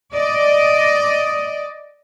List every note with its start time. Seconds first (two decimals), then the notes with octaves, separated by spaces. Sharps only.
0.16 D5 D#5